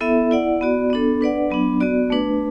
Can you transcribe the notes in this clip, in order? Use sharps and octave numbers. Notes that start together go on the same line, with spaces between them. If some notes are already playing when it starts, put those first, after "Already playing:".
B3 E4 A4 E5
E4 D5 F#5
B3 F#4 D5
B3 D4 A4
D4 B4 D5 F#5
F#3 B3 D4
B3 F#4 D5
A3 D4 B4